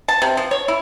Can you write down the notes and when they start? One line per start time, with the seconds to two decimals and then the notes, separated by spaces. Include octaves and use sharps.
0.08 A5
0.22 C3
0.37 F3
0.51 C#5
0.68 E4